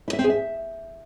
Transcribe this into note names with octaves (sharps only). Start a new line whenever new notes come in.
E4
E5
C4
G#4
E5